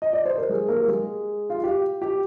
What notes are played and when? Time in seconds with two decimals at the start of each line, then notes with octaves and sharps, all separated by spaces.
0.02 D#5
0.13 D5
0.26 C5
0.38 A#4
0.49 G#3 G#4
0.68 A#3 A#4
0.81 G4
0.88 G#3 G#4
1.50 F4
1.64 G4
2.02 G4